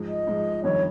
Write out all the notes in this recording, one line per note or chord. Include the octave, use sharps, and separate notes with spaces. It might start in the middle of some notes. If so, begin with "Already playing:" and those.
Already playing: G#2 F3 G#3
D#5
G#2 F3 G#3
G1 F2 D#3 G3 C#5